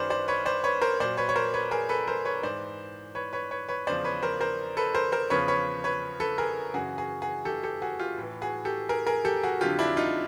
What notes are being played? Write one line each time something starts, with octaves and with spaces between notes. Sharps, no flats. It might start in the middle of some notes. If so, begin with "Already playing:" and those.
Already playing: F#2 D#3 F#3 F#4 G#4 B4 C5 D5
C5 D5
B4 C#5
C5 D5
B4 C#5
A#4 C5
A#2 F#3 C5 D5
B4 C#5
C#5
A#4 C5
B4 C#5
G#4 A#4
A4 B4
A#4 C5
B4 C#5
G#2 E3 C5 D5
B4 C#5
B4 C#5
B4 C#5
B4 C#5
E2 C#3 F3 C5 D5
B4 C#5
A#4 C5
A#4 C5
A4 B4
A#4 C5
A#4 C5
E2 C#3 F3 B4 C#5
B4 C#5
B4 C#5
A4 B4
G#4 A#4
F#2 C#3 E3 F#4 G#4
F#4 G#4
F#4 G#4
G4 A4
G4 A4
F#4 G#4
F4 G4
A2 E3
F#4 G#4
G4 A4
G#4 A#4
G#4 A#4
G4 A4
F#4 G#4
F2 D3 F#3 F4 G4
D4 E4
D#4 F4